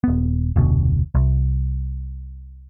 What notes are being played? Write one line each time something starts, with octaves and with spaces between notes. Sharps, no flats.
D#1 B3
F1 D2 B2
C2